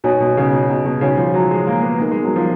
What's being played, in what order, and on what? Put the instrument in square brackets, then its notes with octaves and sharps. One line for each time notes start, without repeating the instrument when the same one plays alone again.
[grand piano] B2 [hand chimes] D#4 F#4 C#5 G#5
[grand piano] B2
C#3
B2
B2
B2
[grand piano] C#3 [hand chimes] D#4 F#4 C#5 G#5
[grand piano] F3
F#3
G#3
A#3
B3
[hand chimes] B3 D#4 A#4
[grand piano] G#3
F#3
F3